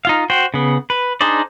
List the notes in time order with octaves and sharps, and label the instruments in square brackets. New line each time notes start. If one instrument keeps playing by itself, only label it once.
[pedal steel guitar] D#4 F4 F5
F#4 C5 G5
C#3 B3
B4
D4 D#4 G#4 C5 D5